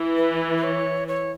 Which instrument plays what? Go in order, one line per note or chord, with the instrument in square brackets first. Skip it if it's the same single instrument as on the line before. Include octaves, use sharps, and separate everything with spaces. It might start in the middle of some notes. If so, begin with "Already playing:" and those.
Already playing: [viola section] E3
[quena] B4
B4
C#5
C#5